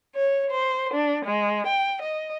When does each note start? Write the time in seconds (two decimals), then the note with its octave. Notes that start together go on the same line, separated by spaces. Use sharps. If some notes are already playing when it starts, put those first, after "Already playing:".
0.15 C#5
0.51 C5
0.94 D4
1.26 G#3
1.67 G5
2.02 D#5